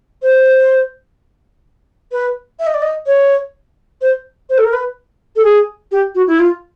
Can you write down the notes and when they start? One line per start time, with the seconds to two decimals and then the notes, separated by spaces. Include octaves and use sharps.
0.22 C5
2.12 B4
2.59 E5
2.67 D#5
2.74 D5
2.82 D#5
3.07 C#5
4.01 C5
4.50 C5
4.58 A4
4.65 A#4
4.73 B4
5.36 A4
5.44 G#4
5.92 G4
6.15 F#4
6.27 E4
6.39 F4